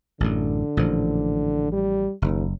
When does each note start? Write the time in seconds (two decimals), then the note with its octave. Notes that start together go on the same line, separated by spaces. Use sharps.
0.20 A1 F#2 A2 D3
0.77 A1 A#2 F3
1.72 G3
2.22 F#1 D#2